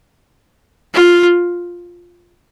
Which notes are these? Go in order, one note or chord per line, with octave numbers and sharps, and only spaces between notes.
F4